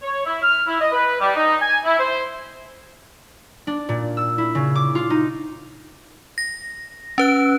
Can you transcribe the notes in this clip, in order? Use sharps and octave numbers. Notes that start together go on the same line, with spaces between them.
C#5
E4
F6
E4
D#5
B4
G3
D#4
G#5
E4
C5
D4
A#2
E6
E4
C#3
D6
F4
D#4
A#6
C#4 B4 F#6